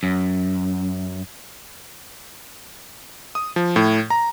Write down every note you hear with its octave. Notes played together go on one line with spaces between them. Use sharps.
F#2
D#6
F3
A2
A#5